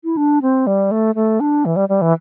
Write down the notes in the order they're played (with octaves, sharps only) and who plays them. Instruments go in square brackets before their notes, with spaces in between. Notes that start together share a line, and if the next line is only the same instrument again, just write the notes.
[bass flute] E4
D4
C4
G3
A3
A3
D4
E3
G3
G3
E3